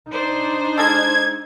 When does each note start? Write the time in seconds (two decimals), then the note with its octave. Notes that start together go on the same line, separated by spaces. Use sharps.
0.10 D4 D#4 C5
0.78 G#3 F4 A4 G#6